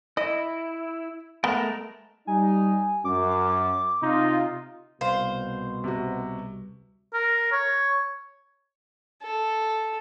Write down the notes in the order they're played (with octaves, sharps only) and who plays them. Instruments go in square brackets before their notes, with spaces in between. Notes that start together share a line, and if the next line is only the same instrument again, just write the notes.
[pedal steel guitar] E4 [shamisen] D#5
[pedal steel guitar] G#3 A3 A#4 [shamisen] B3
[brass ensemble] G3 D#4 [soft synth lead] G#5
[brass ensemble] F#2 [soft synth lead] D6
[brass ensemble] C3 F4 [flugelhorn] D#4
[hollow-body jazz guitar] C2 [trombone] B2 [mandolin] C5 [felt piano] F5
[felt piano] C3 F#4
[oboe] A#4
C#5
[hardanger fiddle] A4